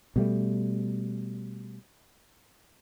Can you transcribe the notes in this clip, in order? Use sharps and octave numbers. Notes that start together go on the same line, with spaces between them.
B2 G3 A3